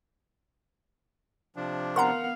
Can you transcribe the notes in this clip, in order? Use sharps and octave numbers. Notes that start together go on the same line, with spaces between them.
C3 F3 D4
B3 A#4 F5 F#5 A#5 C6